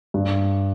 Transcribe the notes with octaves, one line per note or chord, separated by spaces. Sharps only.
G2